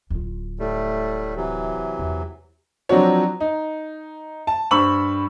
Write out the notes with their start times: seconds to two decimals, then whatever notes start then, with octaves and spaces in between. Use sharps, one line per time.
0.10 D1 F4
0.59 A2 G3 A3
1.36 C3 E3 F#3
1.99 E2
2.89 F3 F#3 C4 D4 F#4 C#5
3.40 D#4
4.47 A5
4.71 G2 C5 B5 C#6 E6 F#7